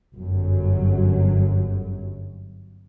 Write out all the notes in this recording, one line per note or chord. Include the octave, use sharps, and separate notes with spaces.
G1 F#2 F#3